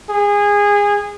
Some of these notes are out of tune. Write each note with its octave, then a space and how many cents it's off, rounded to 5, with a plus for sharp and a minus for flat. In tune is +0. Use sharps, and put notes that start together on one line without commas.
G#4 -25